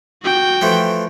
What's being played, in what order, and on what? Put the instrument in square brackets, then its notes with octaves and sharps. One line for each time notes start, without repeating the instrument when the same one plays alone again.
[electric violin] F#4 G5
[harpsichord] E3 F3 A3